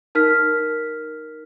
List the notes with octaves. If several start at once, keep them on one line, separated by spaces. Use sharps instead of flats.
D#4 A#4 F6 B6